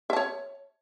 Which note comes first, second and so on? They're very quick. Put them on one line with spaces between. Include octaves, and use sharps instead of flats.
E5 A5 C#5